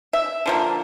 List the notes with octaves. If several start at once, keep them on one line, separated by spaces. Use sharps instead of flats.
E5
D3 F3 A#3